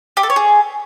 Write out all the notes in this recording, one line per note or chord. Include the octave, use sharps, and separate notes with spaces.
G4
A4
C#5
G#4